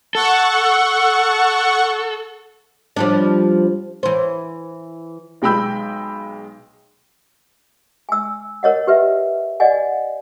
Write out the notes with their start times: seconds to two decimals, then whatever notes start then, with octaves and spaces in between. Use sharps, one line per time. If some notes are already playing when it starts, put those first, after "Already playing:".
0.15 A4 F#5 C#6
2.96 F3 G3 D4
4.03 E3 C5
5.42 B1 G#3 G5 B5 E6 G6
8.09 G#5 E6
8.63 A#4 C#5 D#5 F#5
8.87 G4 B4 E5
9.60 D5 D#5 F#5 G#5